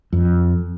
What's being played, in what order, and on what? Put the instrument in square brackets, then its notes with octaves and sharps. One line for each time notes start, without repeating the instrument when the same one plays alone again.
[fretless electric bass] F2